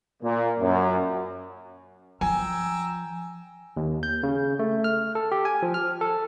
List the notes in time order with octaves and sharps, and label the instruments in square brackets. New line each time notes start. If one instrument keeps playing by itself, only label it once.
[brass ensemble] A#2
F#2
[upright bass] F3 [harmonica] G5 A#5 E6 [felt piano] G#5
[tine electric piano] D#2
G6
C#3
A3
F6
A4
G4
G#5
F3
F6
A4